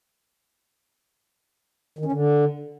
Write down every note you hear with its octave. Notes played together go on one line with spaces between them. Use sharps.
D#3
C#4
D3